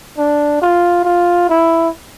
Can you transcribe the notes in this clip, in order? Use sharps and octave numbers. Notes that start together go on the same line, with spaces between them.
D4
F4
F4
E4